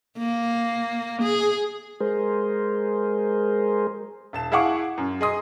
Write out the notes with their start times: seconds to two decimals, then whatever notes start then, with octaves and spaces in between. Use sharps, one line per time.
0.18 A#3
1.22 G#4
2.00 G#3 G#4 A#4 C5
4.33 E1 A5 E7
4.52 E4 G#4 F5 F#5 C#6 D6
4.98 F#2
5.21 G#4 D#5 C6 D#6